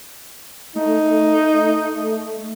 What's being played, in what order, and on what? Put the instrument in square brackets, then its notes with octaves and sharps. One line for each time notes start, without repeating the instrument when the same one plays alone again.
[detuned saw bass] A3 [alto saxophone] D#4